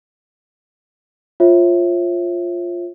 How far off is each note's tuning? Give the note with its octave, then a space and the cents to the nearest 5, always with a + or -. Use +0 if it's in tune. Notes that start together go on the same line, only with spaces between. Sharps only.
F4 +0 C#5 -45 E5 +0